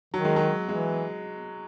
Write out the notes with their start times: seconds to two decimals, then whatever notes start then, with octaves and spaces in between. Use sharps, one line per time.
0.14 D#3 F#3
0.25 G#3
0.36 F#3
0.69 E3 G#3